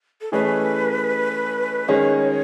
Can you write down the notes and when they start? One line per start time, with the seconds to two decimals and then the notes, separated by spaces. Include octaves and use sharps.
0.21 A4
0.32 E3 A3 C#4 G#4 B4 D#5
1.88 D#3 G#3 C#4 G#4 C#5 D#5